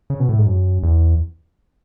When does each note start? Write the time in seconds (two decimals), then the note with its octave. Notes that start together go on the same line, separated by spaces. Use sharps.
0.10 C#3
0.20 B2
0.29 A2
0.38 G#2
0.47 F#2
0.83 E2